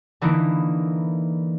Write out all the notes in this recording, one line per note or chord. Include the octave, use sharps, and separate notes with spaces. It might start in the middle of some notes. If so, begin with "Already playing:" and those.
D3 E3 A#3 D#4 E4